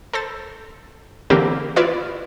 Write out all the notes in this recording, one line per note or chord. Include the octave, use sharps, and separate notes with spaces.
A4 C5 A6
D3 E3 A#3 C4 G4 A#4
E4 F4 B4 D5 F5